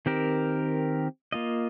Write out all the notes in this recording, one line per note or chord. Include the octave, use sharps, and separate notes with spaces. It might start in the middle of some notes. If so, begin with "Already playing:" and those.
D#3 C4 G4 A#4
A#3 F4 D#5